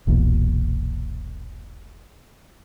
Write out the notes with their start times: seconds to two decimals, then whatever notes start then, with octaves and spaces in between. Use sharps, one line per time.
0.07 E1 B1 E2 A#2